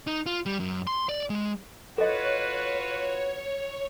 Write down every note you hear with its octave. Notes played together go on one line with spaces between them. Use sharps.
D#4
F4
G3
F#2
C6
D5
G#3
F4 F#4 A4 B4 C#5 D#5